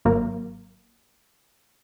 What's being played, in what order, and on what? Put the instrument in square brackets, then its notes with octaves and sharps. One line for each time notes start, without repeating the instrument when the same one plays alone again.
[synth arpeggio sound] G#1 F#3 A#3 A#4